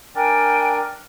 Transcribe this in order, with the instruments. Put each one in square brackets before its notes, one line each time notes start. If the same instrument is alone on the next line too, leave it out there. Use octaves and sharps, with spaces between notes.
[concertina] D4 A#4 D5 [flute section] G5 G#5